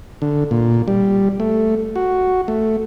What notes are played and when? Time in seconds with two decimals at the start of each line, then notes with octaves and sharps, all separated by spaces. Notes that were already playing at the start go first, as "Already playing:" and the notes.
0.22 D3
0.51 A#2
0.88 G3
1.40 A3
1.96 F#4
2.48 A3